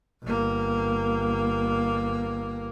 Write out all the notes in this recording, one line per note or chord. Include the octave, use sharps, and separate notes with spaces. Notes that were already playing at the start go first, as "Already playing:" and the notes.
G1 A#3